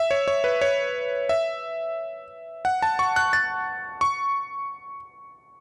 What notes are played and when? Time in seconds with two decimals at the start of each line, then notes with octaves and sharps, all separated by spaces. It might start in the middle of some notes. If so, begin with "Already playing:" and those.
Already playing: E5
0.11 C#5
0.28 C#5
0.44 B4
0.61 C#5
1.29 E5
2.65 F#5
2.82 A5
2.99 C#6
3.16 F#6
3.33 A6
4.01 C#6